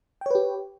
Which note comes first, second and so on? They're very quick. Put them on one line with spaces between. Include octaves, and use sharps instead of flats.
G5 C#5 B4 G4